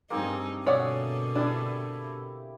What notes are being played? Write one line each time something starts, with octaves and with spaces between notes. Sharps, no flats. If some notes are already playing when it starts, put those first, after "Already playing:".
G2 A#3 C4 D#4 G#4
B2 D3 C#5 D5 E5 F#5 D6 D#6
D4 E4 G4